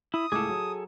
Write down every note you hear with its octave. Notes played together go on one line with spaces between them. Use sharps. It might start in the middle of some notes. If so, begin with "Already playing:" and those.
E4 D#6
C#2 A2 G#4 A4 D6
F#3